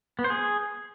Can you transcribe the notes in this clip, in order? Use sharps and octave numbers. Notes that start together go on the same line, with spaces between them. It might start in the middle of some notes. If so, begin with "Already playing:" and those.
B3
C5
G#4